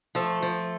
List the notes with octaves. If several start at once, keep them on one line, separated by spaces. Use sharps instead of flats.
F3 A3
F3